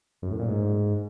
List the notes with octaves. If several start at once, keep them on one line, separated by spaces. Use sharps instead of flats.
F#2
A2
A#2
G#2